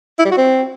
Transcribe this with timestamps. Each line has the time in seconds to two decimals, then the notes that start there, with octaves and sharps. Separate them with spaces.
0.19 E4
0.25 G3
0.31 F#4
0.38 C4